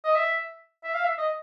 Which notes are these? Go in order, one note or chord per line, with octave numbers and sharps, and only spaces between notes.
D#5
E5
E5
F5
E5
D#5